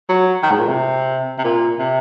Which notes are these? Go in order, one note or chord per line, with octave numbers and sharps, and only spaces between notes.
F#3
D#3
G#2
A#2
C3
C3
A#2
C3